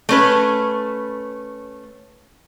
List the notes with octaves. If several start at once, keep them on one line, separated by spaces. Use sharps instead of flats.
A3 C#4 B4